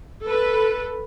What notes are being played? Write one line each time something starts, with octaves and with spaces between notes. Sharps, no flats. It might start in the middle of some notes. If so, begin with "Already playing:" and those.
A4 B4